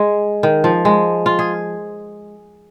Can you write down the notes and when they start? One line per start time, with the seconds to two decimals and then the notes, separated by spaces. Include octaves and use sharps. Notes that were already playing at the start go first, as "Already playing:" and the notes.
Already playing: G#3
0.43 D#3
0.64 F3
0.85 G#3
1.26 F4
1.39 G#4